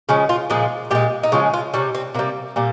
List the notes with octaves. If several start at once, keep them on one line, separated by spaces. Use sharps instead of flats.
C#3 F3 G#3 C#4
F4
A#2 F3 G#3 G#4
A#2 G#3 G4
D#4
C#3 F3 G#3 F4
F4
C3 G3 C#4
C4
C3 G3 A#3
A#2 G3 A#3